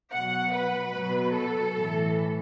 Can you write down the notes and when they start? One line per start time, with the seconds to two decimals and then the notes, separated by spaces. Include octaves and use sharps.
0.12 B2 F#3 F#5
0.53 B4
0.93 B2 F#3
1.34 A4
1.75 A2 E3